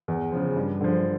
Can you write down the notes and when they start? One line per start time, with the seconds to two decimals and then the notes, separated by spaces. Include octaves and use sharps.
0.08 E2
0.32 C#3 F3
0.57 G2
0.81 D3 F3